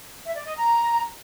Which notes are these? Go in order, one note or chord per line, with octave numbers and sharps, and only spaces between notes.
E5
D5
D#5
A#5